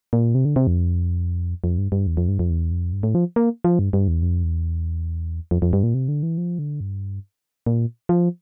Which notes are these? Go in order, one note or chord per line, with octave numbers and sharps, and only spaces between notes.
A#2
C3
D3
C3
F2
F2
G2
G2
E2
F2
G2
F2
E2
F2
G2
A2
F3
A#3
F3
G2
G2
E2
F2
E2
F2
F2
G2
A#2
C3
D3
E3
F3
D3
G2
A#2
F3